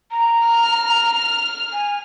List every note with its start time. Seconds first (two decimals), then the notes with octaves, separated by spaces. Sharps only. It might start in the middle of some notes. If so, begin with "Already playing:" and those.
0.11 A#5
0.46 F6
1.73 G#5